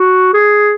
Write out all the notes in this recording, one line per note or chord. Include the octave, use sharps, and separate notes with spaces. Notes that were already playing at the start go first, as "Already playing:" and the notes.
Already playing: F#4
G#4